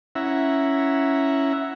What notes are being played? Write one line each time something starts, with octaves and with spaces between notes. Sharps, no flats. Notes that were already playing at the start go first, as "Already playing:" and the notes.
C#4 E4 E5 F#5 A#5